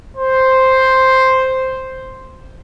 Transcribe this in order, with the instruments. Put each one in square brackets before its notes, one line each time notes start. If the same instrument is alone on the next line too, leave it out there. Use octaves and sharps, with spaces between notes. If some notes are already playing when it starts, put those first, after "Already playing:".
[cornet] C5